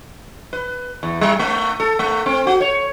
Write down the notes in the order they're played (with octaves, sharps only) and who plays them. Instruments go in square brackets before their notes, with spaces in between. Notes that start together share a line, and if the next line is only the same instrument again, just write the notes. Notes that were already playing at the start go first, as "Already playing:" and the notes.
[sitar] B4
E2
G3
A3
A4
A3
C4
F#4
C#5